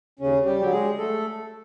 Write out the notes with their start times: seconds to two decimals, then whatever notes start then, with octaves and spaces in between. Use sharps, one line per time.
0.19 D#2 C#3 C#4
0.45 G3 G4
0.60 D3 F#3 G4
0.72 G#3 G#4
0.98 A3 A4